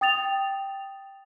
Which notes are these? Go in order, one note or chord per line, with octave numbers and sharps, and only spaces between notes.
G5 D#6 A6 F7